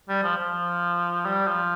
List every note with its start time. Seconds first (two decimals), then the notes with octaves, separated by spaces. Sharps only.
0.09 G3
0.24 F3
0.37 F3
1.26 G3
1.47 F3